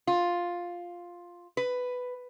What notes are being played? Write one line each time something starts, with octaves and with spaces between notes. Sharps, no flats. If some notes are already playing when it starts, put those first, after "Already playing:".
F4
B4